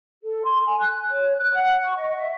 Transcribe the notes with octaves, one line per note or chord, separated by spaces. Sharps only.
A4
C6
G#5
F#6
C#5
F#6
F#5
C#6
D#5
E5